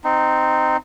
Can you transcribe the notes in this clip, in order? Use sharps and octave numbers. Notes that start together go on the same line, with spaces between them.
C4 D#4